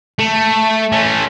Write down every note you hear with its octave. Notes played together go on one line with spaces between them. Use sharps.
A3
A3 C#4